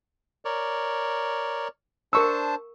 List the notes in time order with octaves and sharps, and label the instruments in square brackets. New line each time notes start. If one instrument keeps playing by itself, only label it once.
[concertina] A#4 C#5 D5
[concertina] D4 C5 A5 [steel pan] A#4 C#6 E6